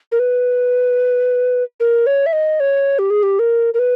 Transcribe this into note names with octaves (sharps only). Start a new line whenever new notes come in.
A#4
B4
A#4
C#5
E5
D#5
C#5
G4
G#4
G4
A#4
A#4
B4